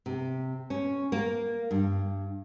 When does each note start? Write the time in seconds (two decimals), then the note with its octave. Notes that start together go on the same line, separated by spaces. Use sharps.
0.06 C3
0.70 C#4
1.12 A#3
1.71 G2